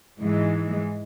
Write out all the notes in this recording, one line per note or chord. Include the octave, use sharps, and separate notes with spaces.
G#2 E3 G#3